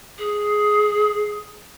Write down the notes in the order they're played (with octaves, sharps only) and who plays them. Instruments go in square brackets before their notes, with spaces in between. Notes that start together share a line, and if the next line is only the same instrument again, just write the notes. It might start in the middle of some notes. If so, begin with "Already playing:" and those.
[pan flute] G#4